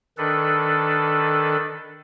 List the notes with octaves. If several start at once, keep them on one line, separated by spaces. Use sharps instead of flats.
D#3 D4 A4 B4